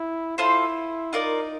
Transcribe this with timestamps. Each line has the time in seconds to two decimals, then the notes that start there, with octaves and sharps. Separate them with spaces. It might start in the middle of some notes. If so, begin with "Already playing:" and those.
Already playing: E4
0.37 E4 F4 A4 C5
1.13 D#4 F4 A#4 D5